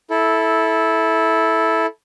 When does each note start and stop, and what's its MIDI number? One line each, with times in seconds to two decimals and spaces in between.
0.10 1.86 64
0.10 1.86 69